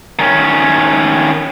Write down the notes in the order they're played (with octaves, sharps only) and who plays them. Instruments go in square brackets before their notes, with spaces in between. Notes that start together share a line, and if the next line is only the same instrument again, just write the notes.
[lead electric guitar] D#3 C#4